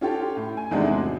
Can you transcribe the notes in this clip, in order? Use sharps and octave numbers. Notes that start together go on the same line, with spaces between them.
C#4 F4 G4 A4
A2
G#5
E2 C3 D#3 G#3 A3 D4
G#1